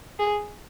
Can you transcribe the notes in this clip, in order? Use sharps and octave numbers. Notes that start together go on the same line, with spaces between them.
G#4